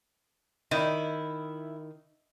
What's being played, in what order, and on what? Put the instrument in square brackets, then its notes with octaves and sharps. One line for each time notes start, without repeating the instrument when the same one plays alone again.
[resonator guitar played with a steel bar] D#3 [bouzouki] E4